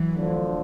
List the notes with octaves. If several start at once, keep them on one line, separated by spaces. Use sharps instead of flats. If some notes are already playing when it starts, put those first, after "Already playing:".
Already playing: E3 F#3
D2 D3 F3